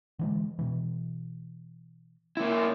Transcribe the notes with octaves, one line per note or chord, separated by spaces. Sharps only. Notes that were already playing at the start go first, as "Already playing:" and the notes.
D3 E3 G#3
B2 E3
A#3 E4